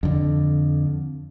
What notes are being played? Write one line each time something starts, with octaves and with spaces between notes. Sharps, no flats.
F2 D3